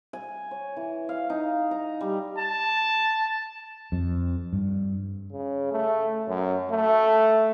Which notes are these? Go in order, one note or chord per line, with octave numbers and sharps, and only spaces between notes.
G#5
C#5
E3
F5
D#4
A#5
G3
A5
F2
G2
C#3
A3
F#2
A3